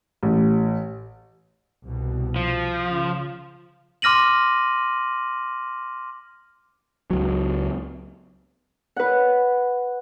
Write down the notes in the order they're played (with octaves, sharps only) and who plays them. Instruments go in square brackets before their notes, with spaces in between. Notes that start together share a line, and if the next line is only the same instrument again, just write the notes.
[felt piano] A1
[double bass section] C2 B2
[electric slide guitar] F3
[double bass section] C#3
[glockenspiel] C6 D6 F6 A#6 D#7 F#7
[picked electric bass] C#2 F#3
[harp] B4 F#5